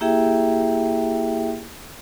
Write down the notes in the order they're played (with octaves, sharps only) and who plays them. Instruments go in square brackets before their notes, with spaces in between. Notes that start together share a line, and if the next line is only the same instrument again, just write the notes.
[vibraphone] A#3 E4 G4 G#4 E5 G5